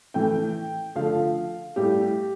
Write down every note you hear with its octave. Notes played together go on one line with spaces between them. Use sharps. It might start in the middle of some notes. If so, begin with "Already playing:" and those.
A2 E3 A3 G5
D3 F3 A3 F5
A2 G3 G4